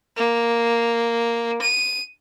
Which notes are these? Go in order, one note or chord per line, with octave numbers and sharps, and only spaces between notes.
A#3
D#7